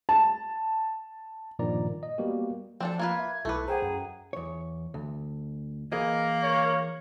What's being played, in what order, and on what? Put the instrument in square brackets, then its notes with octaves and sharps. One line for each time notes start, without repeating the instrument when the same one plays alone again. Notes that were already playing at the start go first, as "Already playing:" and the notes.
[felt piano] A5
[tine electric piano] G2 A#2 D#3 F3 D5 A#5
D#5
G3 A#3 B3 F#4 G4
[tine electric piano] F3 [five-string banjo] C4 D4 A4
[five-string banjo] A#3 F4 B4 [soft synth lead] G#6
[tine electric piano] E5
[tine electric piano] B1 E4 D6 [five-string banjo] A3 B4 [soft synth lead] A4
[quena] G#4 [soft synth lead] C5 [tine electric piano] F#5 G5 A#5
[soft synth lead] F#2
[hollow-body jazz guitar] E2 C#5
D2
[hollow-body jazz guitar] E3 G#4 D#5 [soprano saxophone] A#3
[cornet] C#5